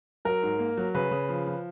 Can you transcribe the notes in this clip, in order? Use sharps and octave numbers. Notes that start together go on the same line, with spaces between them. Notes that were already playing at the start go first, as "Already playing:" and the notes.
F#3 A#4
G#2
A#3
F#3
C#3 B4
C#3
F3
F3